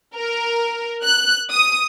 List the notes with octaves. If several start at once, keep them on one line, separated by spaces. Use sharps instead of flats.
A#4
F#6
D#6